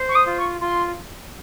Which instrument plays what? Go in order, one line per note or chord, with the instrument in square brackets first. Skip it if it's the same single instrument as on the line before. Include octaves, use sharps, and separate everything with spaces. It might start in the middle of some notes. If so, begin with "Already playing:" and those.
Already playing: [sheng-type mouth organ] C5
[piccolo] C#6
D#6
[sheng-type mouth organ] F4
[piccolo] C#6
[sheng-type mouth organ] F4 [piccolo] C6